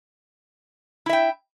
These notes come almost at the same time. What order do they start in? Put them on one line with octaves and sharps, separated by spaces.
E4 E5 G5